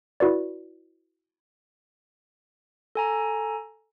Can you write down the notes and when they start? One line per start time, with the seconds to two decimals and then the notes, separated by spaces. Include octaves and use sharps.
0.20 E4 F#4 B4 D5
2.95 A4 G#5 A#5